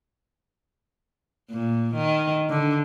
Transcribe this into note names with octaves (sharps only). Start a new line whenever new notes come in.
A#2
D#3
D3